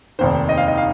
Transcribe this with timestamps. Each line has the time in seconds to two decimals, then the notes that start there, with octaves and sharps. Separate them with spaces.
0.19 F1 D#2 D#3 C5
0.49 D#5
0.57 F5
0.68 D#5
0.78 F5